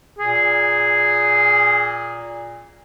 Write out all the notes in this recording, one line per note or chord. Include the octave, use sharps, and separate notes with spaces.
A#2 G#4